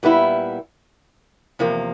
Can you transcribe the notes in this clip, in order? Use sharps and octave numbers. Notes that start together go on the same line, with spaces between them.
A#2 G3 B3 E4
E2 C3 F3 A#3